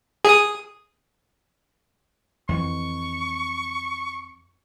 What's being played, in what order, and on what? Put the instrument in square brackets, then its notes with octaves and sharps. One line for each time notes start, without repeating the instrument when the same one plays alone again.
[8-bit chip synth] G#4 D#6
[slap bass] F2 E3 [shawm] C#6